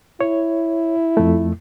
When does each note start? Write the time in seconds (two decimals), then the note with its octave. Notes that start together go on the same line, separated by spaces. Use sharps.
0.21 E4 C#5
1.17 F2 A3